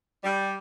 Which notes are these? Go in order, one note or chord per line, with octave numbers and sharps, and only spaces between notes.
G3